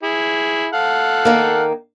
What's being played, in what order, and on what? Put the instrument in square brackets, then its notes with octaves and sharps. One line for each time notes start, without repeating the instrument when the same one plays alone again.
[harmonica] E4 G#4
A4 F5 F#5
[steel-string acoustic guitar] D#3 A#3